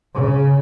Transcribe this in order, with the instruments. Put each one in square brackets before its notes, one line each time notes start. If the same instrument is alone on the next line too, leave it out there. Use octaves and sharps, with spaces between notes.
[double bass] C#3